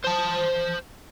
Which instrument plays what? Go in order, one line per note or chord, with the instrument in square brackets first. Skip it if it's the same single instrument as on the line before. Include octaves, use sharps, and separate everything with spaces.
[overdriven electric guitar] C5 A5